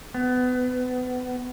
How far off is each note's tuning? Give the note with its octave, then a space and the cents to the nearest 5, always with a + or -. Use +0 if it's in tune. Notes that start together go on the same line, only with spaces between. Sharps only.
B3 +25